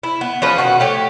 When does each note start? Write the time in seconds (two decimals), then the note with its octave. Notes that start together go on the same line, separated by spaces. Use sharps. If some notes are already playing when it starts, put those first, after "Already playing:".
0.03 E4
0.21 B3
0.42 F3 C#4 B4
0.58 B2 D#3 F#4
0.80 A3 G4 C#5